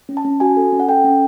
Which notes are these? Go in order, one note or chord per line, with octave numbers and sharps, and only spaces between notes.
C#4
A5
C#4
F#4 G#5
A4
C#4
F#5
A4 G5
C#4